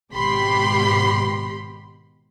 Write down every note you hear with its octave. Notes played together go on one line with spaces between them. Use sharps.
G#1 B2 G4 B5 C6